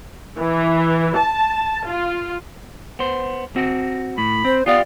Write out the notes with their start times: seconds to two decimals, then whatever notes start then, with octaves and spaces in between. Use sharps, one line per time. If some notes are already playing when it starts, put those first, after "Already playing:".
0.38 E3
1.17 A5
1.87 F4
2.99 B3 C5
3.56 C4 F#4
4.18 A2 B5
4.45 C4 C5
4.66 B3 F4 G4 D5 F5